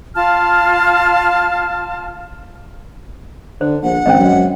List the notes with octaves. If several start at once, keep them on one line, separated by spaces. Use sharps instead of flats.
F4 F5 A5 F6
D3 C5
A#1 F#5
G#1 C#4 C5 D#5
F#2